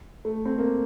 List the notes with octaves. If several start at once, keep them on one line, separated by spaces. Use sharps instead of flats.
A3
C4
A#3